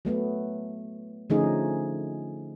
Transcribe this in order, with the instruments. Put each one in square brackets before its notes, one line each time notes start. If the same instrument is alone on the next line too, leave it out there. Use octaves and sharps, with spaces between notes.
[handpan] F#3 A3 B3
D3 F3 A3 C#4 D#4 G#4